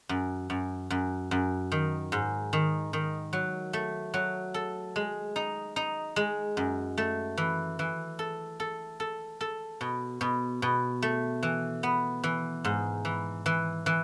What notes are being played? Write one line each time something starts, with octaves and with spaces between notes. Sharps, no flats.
F#2
F#2
F#2
F#2
D#3
G#2
D#3
D#3
F#3
A3
F#3
A4
G#3
D#4
D#4
G#3
F#2
A3
E3
E3
A4
A4
A4
A4
B2
B2
B2
A3
E3
B3
E3
G#2
E3
E3
E3